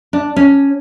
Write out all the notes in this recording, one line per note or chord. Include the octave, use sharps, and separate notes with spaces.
D4
C#4